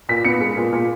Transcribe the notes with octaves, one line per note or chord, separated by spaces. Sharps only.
A#2 B6
B3 C#7
G#3
A#2
A#2